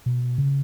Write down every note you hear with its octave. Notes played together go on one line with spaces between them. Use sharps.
B2
C#3